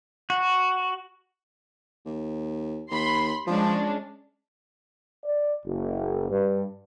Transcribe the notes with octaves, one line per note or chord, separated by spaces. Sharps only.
F#4
D#2
D#2 B5 C6
F3 G#3 C#4 D4
D5
F#1
G2